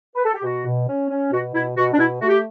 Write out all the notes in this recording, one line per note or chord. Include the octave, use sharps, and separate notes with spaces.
B4
A4
G4
B2 F#4
B2
C#4
C#4
B2 F#4
B2 E4
B2 F#4
D4
B2 E4
A3 F#4
G4